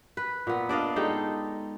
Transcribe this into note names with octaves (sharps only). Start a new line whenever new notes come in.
B4
A#2 B3
D4 D5 D#5 F5
G#3 D#4 G4 A4